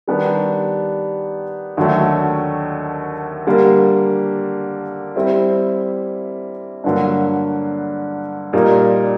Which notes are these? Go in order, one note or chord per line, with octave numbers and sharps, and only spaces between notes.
D#3 G3 B3 D4 G4
D#2 D3 F#3 A3
D3 G3 A#3
G3 C4 E4
G2 D3 F#3 A#3
A#2 G3 A#3 D#4